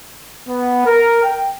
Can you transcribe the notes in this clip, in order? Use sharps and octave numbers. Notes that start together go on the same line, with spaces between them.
B3
A#4
G5